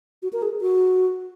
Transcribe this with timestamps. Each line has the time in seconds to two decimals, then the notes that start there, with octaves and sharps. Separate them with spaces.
0.23 F#4
0.33 A#4
0.42 G#4
0.61 F#4